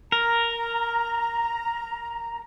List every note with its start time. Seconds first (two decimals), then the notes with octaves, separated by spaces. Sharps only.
0.12 A#4 A#5